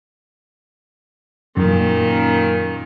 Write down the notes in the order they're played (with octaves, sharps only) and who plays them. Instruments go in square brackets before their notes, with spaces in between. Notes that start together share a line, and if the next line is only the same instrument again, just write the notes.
[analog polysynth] F#2 [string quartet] A#2 D#3